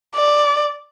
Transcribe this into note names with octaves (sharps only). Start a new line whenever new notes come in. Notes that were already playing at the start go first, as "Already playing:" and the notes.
D5